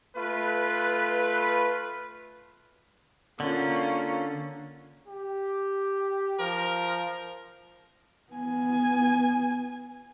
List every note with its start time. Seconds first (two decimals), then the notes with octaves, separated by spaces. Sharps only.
0.16 A3 F4 B4
3.40 D3 A#3 C#4 F4
5.08 G4
6.40 F3 A#4
8.33 B3 G#5